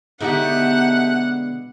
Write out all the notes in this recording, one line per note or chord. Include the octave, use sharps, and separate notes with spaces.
B2 D3 G#3 A3 D#4 G4 F#5